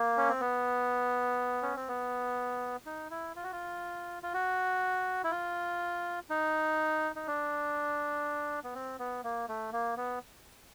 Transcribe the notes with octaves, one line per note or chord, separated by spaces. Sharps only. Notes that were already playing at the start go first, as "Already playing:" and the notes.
Already playing: A#3
C#4
C4
B3
C#4
C4
B3
D#4
E4
F4
F#4
F4
F4
F#4
E4
F4
D#4
D#4
D4
B3
C4
B3
A#3
A3
A#3
B3